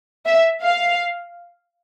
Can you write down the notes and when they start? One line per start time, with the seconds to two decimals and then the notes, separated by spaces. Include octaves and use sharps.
0.26 E5
0.63 F5